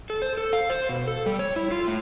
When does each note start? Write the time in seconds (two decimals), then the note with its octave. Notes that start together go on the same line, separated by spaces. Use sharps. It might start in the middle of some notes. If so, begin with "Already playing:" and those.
0.10 A4
0.22 C5
0.37 A4
0.53 F5
0.70 C5
0.89 B2
1.07 A4
1.26 G3
1.39 C#5
1.56 E4
1.71 F4
1.87 A2